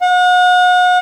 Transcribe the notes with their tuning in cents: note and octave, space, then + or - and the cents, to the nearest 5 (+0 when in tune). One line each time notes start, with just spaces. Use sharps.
F#5 -35